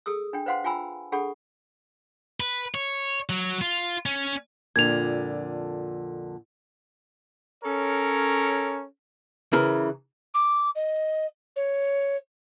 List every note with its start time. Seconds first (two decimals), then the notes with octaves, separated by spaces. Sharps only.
0.06 G#4 A4 D#6 E6
0.33 D4 G5
0.46 B4 C5 F5 F#5 C6
0.64 F4 G5 G#5 A#5 B5 E6
1.12 D4 G#4 A4 F#5 B5 C#6
2.40 B4
2.75 C#5
3.29 F#3
3.61 F4
4.06 C#4
4.76 F2 A#2 D3 G#6 F7
7.64 C#4 A4 A#4 C#5
9.53 C#3 E3 A#4
10.34 D6
10.75 D#5
11.56 C#5